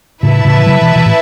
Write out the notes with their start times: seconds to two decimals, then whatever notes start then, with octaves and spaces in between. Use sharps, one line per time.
0.23 A2 C#3 E4 B4 E5 A5
0.45 A2 C#3
0.57 E3
0.66 C#3 F#3
0.81 B2 E3
0.95 B2 E3
1.06 A2